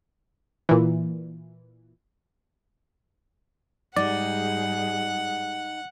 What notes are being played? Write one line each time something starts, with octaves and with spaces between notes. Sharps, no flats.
A#2 E3
G#2 G3 D#4 G#4 D5 F#5